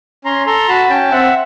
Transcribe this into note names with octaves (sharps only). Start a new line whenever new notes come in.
C#4 A#5 C6
A4 A#5 C6
F#4 A5 B5
C#4 G5 A5
C4 E5 F#5